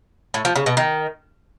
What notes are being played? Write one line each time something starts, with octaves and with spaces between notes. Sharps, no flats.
A2
F3
C#3
B2
D#3